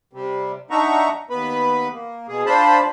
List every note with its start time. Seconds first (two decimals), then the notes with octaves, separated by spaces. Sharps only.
0.13 C3 G3
0.71 D4 D#4 E5 F#5 A#5 C#6
1.30 D#2 B3 B4 B5
1.92 A#3
2.28 B2 G#4
2.46 D4 F4 C5 A5 B5